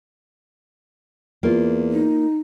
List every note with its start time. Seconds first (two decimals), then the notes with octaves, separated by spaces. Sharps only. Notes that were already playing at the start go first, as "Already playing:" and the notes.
1.43 E2 A#3 F4
1.91 D#4